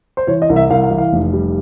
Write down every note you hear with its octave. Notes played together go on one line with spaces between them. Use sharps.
C5
E3 C#5
D#5
C2
E5
C2 F5
F5
E3
F5
F1
G3